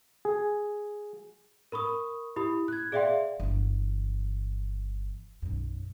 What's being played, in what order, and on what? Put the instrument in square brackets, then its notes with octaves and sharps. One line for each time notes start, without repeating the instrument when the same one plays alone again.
[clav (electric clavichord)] G#4
[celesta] A#4 B5 C#6 D#6
E4 G4 B5 D#6
F#6 G#6
G#4 D5 E5 F5 G5 C6
[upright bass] G1 E3
B1 F#2